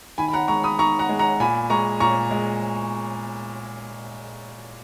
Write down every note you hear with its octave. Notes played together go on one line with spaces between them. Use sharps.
D#3 G#5 B5
B5
F#5 A#5
G#3 A#5 C#6
B5 D#6
D#3 A#5 C#6
F#5 A#5
G#3
F#5 A#5
A#2 G#5 B5
G#3 A#5 C#6
A#2 A#5 C#6
G#3